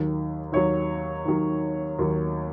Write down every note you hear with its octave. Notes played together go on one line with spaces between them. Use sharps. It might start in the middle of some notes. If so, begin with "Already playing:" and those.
Already playing: D#2 D#3 F#3
D#2 D#3 F#3 C#5
D#2 D#3 F#3
D#2 D#3 F#3